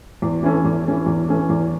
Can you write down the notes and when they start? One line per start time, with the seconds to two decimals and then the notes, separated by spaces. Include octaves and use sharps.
0.22 E2
0.43 E3 C#4 A4
0.64 E2
0.85 E3 C#4 A4
1.06 E2
1.29 E3 C#4 A4
1.49 E2